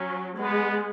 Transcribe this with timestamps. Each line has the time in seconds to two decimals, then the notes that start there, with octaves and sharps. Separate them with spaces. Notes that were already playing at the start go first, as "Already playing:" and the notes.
Already playing: F#3 C#4
0.38 G#3 B3